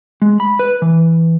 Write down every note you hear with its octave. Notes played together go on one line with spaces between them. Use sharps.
G#3
B5
B4
E3